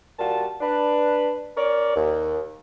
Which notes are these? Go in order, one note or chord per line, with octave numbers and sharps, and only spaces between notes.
A#2 G3 F4 F#4 A5
D4 B4
C#4 A#4 C#5 D5
D#2